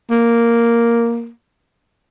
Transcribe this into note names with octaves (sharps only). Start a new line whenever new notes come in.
A#3